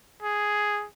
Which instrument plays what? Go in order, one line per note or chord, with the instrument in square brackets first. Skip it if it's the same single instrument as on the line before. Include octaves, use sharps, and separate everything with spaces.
[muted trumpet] G#4